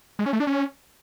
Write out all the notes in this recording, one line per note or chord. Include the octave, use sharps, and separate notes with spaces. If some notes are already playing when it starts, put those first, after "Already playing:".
G#3
C#4
A3
D4
C#4